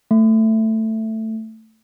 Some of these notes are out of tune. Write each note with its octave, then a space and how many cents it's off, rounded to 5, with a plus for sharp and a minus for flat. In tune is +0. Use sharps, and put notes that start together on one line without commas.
A3 +10